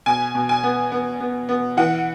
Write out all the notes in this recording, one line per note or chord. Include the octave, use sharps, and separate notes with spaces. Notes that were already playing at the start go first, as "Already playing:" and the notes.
B2 G#5
B2
G#5
B3
B3
B3
B3
E3 F#5